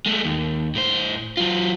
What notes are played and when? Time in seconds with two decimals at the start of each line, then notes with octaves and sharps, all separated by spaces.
0.06 G#3 A3
0.25 D#2
0.75 A2 C5
1.37 F#3 F4